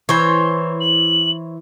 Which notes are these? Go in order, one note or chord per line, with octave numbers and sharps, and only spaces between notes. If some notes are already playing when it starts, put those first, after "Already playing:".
E3 C5 C#5 C6
F#7